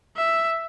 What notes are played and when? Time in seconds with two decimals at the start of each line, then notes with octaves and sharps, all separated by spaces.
0.16 E5